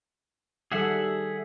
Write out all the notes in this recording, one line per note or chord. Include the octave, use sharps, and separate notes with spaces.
D#3 G3 G#4 A4 E5 F#5